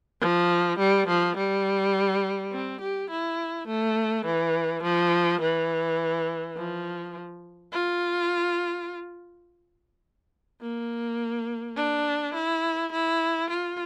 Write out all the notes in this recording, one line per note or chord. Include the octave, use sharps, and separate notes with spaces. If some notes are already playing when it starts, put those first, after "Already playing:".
F3
G3
F3
G3
C4
G4
E4
A3
E3
F3
E3
F3
F4
A#3
D4
E4
E4
F4